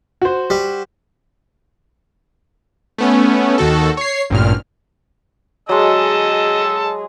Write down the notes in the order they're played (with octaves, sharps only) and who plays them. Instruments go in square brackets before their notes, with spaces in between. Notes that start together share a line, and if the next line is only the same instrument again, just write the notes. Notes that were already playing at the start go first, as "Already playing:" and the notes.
[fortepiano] F#4 C5
[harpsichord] G3
[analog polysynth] A3 B3 C#4
D#2 D#3 F#4 A4
C#5 C7
A1 G2 A#2 F6
[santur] F#3 G#3 [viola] G#4 [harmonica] D#5 A5 E6